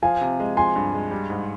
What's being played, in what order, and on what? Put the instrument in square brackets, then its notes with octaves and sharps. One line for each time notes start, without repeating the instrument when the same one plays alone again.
[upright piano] F3 [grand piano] F5 G#5
[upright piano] C3
G#3
[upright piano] F3 [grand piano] G#5 C6
[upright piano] G2
G#3
G3
G#2